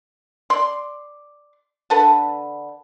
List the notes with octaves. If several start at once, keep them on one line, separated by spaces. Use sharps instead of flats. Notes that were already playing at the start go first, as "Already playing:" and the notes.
D5 C6
D3 A4 B4